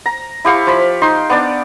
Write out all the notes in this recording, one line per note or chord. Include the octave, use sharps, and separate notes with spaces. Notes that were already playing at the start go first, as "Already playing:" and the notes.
A#5
E4 G4 F5 C#6
F3 B5
D#4 C6
B3 D4 D5